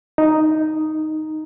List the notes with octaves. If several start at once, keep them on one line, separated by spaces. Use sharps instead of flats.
D#4